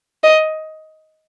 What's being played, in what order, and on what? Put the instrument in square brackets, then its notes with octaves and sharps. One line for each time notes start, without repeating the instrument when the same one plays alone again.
[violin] D#5